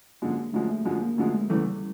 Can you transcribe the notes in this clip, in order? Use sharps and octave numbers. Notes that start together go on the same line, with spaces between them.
F#2 D3 F3 G#3 A#3
F#2 D3 F3 G#3 A3
A3
F#2 D3 F3 G#3
A#3
F#2 D3 F3 G#3 A3
G#3
E2 C#3 E3 G3 A3